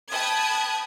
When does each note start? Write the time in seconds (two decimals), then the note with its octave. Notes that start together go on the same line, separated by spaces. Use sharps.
0.11 G5 A5 B5 D#6 F#6 G#6